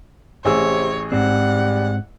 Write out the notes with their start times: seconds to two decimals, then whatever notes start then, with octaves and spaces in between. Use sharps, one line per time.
0.45 A1 C3 G#4 C#5 E6
1.12 G#2 G3 C4 F#5